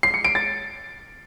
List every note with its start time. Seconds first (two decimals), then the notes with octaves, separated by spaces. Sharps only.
0.03 C7
0.14 C#7
0.25 D7
0.35 A6